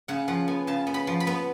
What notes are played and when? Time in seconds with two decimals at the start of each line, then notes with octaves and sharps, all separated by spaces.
0.08 C#3 F#5
0.28 F3 F#5
0.48 B3 G#5
0.67 C#3 A5
0.87 B3
0.94 B5
1.07 F3
1.20 B5
1.27 B3